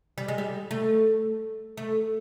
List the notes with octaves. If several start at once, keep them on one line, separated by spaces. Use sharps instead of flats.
G3
G#3
G3
A3
A3